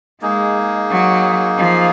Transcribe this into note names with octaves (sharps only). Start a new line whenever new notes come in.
G#3 A#3 D#4 G#4
F#3
F3